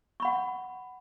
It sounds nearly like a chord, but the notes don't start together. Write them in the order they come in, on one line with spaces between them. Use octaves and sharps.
C#6 B5 F#5